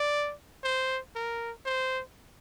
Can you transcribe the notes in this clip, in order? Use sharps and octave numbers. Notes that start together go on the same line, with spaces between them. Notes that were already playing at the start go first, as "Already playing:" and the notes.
Already playing: D5
C5
A#4
C5